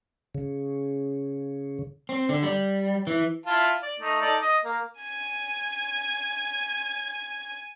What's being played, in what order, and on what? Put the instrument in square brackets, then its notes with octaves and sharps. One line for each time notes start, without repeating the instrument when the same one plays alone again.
[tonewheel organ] C#3
[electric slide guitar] C4
D3
G3
E3
[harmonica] E4 F4 A5
D5
A3 D#4
D#4 A4 D5
D#5
A#3
[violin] G#5 G#6